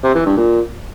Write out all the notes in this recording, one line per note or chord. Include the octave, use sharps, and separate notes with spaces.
C3
E3
G2
A#2